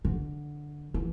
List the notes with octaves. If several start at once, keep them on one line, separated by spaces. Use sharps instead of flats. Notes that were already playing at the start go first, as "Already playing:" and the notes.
D3
E3